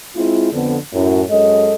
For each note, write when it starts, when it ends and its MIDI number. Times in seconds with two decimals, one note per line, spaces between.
0.15 0.49 56
0.15 0.49 60
0.15 0.49 64
0.15 0.49 65
0.52 0.77 41
0.52 0.77 50
0.52 0.77 59
0.93 1.22 42
0.93 1.22 45
1.30 1.74 42
1.30 1.74 56
1.30 1.74 69
1.30 1.74 75